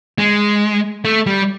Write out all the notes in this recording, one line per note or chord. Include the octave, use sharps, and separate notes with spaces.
G#3
A3
G3